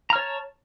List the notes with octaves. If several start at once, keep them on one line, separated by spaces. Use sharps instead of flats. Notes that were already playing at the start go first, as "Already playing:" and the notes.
C#5 A5 A#5 F6